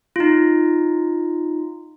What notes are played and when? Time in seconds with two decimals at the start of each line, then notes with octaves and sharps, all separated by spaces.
0.16 D#4 F4